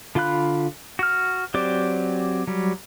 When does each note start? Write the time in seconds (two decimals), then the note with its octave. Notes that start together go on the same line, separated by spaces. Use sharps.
0.15 D3 F4 F5 B5 F#6
0.99 F#4 F6
1.54 F#3 C4 G4 C5 D5
2.47 F#3 G3